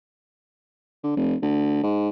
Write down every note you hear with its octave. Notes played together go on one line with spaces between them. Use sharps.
D3
F1
D2
G#2